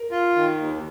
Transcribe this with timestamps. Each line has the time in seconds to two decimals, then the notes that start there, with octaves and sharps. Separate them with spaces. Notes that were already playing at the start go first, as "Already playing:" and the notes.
Already playing: A#4
0.11 F4
0.36 D#3
0.59 D#2